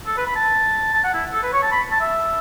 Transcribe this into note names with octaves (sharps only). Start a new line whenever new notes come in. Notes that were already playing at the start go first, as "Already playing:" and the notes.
A4
B4
B5
A5
A5
F#5
E4
A4
B4
C#5
A5
B5
A5
E5